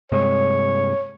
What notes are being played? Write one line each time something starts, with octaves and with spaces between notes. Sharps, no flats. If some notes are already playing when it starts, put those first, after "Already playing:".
G2 C3 G#3 C#5